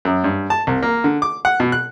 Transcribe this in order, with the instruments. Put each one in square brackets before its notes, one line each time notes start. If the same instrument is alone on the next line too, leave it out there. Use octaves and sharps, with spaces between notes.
[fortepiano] F#2
G2
A5
C2
A#3
D3
D6
F#5
B2
F#6